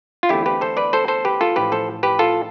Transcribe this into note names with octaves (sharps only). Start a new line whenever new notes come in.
F4
E2 D3 A3 C4 E4 G4
G4 B4
A4 C5
B4 D5
A4 C5
A4 C5
G4 B4
F4 A4
A1 A2 F3 G4 B4
A4 C5
G4 B4
F4 A4